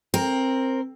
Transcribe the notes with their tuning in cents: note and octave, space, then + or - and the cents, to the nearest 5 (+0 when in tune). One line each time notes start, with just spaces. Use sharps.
C4 +15 A#4 +0